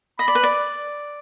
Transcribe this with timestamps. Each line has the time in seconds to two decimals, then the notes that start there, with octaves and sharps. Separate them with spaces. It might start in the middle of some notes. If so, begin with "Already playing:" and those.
0.19 D#5 B5
0.28 D5
0.35 B4
0.44 D5